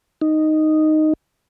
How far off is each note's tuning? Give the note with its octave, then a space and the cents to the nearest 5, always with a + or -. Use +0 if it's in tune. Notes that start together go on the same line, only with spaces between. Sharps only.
D#4 -5